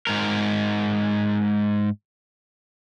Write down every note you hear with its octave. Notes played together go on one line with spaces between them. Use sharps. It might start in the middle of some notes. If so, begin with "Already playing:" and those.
G#2 A#4